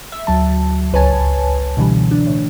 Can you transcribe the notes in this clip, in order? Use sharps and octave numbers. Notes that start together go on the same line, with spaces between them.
E5
D2 F#3 A5
G#1 C#2 B4 C#5 G#5 A5
B2 D3 E3 G3
D4
A2